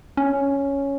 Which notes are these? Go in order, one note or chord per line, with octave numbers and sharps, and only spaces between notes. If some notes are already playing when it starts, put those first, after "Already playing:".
C#4